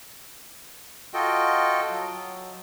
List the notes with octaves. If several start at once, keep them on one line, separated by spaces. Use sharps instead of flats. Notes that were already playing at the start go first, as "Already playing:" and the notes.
F4 F#4 A4 D#5 G5
F#3